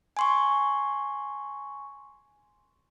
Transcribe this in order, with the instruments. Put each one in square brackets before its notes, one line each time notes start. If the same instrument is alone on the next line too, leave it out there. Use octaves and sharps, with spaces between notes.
[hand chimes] G#5 C6 C#6